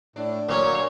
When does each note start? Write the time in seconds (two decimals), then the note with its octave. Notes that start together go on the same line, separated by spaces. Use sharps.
0.16 A2 D4
0.49 A#2 F#3 A#3 C#4 C#5